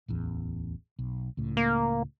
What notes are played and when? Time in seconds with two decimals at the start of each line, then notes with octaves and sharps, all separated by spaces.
0.08 D1 A1 E2
0.99 B1
1.37 C#2 A2
1.57 A#3